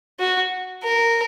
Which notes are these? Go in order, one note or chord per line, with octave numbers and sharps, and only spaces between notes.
F#4
A#4